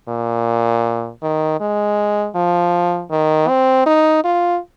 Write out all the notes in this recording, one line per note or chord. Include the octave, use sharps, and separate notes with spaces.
A#2
D#3
G#3
F3
D#3
C4
D#4
F4